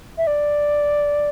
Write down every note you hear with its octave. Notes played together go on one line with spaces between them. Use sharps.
E5
D5